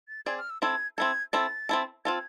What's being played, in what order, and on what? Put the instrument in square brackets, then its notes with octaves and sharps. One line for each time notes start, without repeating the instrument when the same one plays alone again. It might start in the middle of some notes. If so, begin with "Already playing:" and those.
[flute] A6
[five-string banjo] C4 G#4 D5 [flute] G#6
[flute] F6
E6
[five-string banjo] C4 E4 A4 [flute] G#6
[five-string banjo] C4 E4 A4 [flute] G#6
[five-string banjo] C4 E4 A4 [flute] A6
[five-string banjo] C4 E4 A4
[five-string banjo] C4 F4 A4 [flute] G#6